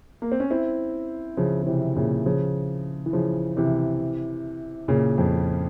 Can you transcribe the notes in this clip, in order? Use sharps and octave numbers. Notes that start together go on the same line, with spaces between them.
A#3
C4
C#4
C4 E4
C#3 F3
C#3
C3 E3
A#2 C#3
C#3 F3
E3
C#3 F3
C3 E3
A#2 C#3
F2